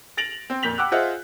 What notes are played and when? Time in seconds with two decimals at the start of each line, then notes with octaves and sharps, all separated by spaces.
0.17 A6 A#6 D7 F7 F#7
0.50 C4
0.63 F2 A#2 G6 B6 F7 F#7
0.78 F#5 G5 D6 E6 F#6
0.92 F4 G#4 C5 D#5 E5 F#5